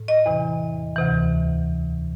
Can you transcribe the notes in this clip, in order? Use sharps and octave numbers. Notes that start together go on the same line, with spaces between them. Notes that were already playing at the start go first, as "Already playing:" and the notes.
Already playing: A2
D#5
E2 C3 E3
D2 C3 E3